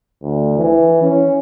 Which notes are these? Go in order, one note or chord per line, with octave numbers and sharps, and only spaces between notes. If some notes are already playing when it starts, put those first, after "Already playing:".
D2
E3
C#4